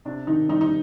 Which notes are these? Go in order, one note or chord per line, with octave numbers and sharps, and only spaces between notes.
C3 D4
D#3 D#4
G3 D#4
D#4